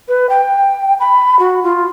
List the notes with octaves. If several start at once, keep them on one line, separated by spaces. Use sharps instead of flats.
B4
G5
B5
F#4
F4